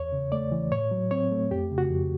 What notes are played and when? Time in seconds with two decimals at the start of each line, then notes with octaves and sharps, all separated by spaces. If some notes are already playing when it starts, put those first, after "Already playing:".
Already playing: E2 C#5
0.13 C#3
0.32 A3 D5
0.52 E3
0.71 A2 C#5
0.91 F#3
1.11 C4 C#5
1.32 A3
1.51 F2 G4
1.71 C#3
1.78 F#4
1.91 F2